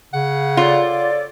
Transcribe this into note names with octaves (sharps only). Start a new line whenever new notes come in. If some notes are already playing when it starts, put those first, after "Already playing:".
C#3 F#5
F4 A4 C#5 D5